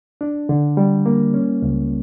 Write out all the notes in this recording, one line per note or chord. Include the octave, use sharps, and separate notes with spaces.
D4
D3
G3
A#3
C#4
C#2